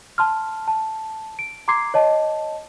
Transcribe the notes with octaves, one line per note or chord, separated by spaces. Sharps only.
A5 C6 F6
A5
D7
A#5 C6 D6 G#6 C7
C#5 D#5 A5